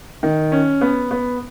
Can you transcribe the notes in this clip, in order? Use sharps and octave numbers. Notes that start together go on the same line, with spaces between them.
D#3
C#4
B3
B3